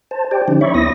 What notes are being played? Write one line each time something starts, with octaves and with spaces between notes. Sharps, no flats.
C5 A5
G4 C5 D5 G5
D3 F3 C#4 D#4
C#5 D5 E5 B5 C#6
D2 B3 E4 D#6 A#6